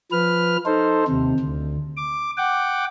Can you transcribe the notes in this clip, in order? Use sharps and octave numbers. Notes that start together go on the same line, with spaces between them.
F3 B4 F6
D#4 A4 C5
D#2 C3
D2
D6
F#5 G5 D6